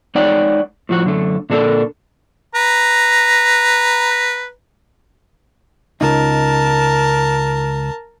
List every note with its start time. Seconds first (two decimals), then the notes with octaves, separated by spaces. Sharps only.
0.15 G#3 D#4 C#5 D5 F#5 G5
0.89 A2 F3 F#4
1.04 F#2 D3 A3
1.50 A#2 D3 D4 D#4 A4 A#4
2.55 B4 A#5
6.01 C#2 D#4 A#4 A5